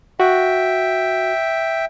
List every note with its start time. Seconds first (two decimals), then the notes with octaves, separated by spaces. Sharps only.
0.20 F#4 E5 G5